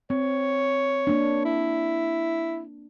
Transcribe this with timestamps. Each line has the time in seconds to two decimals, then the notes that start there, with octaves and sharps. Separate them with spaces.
0.10 C4 C#5
1.07 A#3 D4
1.45 E4